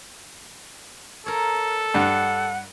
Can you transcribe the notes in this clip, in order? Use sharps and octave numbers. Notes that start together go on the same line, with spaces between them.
A4 A#4 C#5
G2 F#5